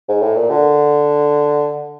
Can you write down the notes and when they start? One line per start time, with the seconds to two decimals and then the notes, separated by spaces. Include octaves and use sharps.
0.09 G#2
0.22 A2
0.36 A#2
0.50 D3